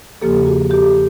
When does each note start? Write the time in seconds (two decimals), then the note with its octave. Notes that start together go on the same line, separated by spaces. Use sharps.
0.21 E2 C#3 F3 A#3 G4 A4
0.46 F#4 G#4
0.70 G4 A4